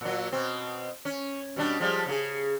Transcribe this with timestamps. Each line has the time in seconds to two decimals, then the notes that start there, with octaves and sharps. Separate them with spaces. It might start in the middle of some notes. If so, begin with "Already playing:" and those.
0.01 A#2 F#3
0.32 B2 C4
1.05 C#4
1.56 B2 G3 D4
1.80 F3 G3 G#3
2.07 C#3 A#3 G#4